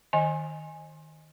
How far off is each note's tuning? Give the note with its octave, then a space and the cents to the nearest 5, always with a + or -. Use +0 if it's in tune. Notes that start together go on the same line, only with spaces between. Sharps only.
D#3 +0 D#5 +0 G#5 +0